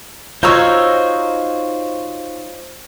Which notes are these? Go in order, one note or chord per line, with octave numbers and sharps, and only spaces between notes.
D#4 F4 F#4 C5 C#5 A#5 E6